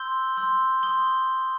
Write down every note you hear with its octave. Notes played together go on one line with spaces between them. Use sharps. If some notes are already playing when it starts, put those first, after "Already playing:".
Already playing: C6 E6 G6 G7
C6 E6 G6
C6 D#6 G6 G7